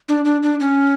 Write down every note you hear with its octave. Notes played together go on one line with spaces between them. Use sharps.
D4
D4
D4
C#4